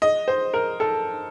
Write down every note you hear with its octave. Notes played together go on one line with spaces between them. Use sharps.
D#5
C5
A#4
A4